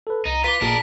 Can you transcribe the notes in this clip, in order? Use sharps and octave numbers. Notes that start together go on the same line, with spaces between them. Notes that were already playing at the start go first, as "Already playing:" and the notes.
A4 B4
C2 D#4
F4 B4 D6 B6
A1 A#2 D4 G#4 A#4